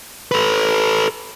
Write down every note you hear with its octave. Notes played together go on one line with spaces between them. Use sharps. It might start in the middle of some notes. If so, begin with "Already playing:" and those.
A4 B4